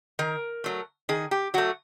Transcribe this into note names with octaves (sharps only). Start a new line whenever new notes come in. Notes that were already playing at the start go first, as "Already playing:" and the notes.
D#3 A#4
F#3 A3
D#3 G#4
G4
F#3 A3 F#4